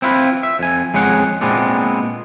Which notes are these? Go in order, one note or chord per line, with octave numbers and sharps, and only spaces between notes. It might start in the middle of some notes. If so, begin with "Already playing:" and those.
C4 E4 F4 B4
E5
F2 G#5
F2 G#3 C#4 G#4 F#5
A#2 G#3 B3 C4 D4